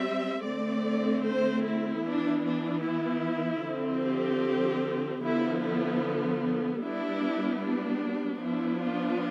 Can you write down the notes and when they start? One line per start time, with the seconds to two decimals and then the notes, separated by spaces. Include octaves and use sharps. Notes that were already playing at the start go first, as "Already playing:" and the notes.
Already playing: G3 C4 E5
0.44 D3 A3 C4 D5
1.24 C5
1.64 E4
2.03 E3 B3 D4
2.44 D4
2.84 E4
3.63 D3 F3 C4
4.03 G4
5.23 D3 F3 B3 E4
5.63 E4
6.82 G3 B3 D4 E4
7.62 D4
8.41 F3 B3 D4 E4
8.81 F4